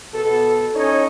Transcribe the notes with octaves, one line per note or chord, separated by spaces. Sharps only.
B2 A4
A2 C#4 D#4 C#5 D#5